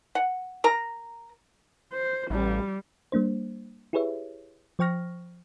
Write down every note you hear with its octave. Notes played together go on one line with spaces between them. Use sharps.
F#5
A#4 A#5
C5
A1 G3
G3 A#3 D4 C5
E4 G4 G#4 B4 C#5 E5
F3 C5 G5 C#6 F6 A#6